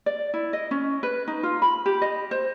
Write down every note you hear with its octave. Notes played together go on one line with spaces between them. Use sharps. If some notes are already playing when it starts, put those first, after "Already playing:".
D5
E4
D#5
C#4
B4
D#4
F4
B5
G4
D#5
C5